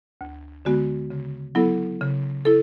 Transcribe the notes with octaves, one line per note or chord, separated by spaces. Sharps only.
D2
D3 G#3 B3 F#4
C#3
F#3 B3 E4 A4
C#3
E4 A4